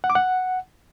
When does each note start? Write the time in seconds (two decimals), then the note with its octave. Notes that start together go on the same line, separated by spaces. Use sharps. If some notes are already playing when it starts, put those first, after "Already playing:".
0.04 F#5
0.10 D6
0.15 F#5